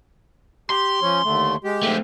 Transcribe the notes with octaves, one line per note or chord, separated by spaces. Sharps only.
G4 C6
F3 C#4
D#2 D3 A3
G#3 G4
A3 C4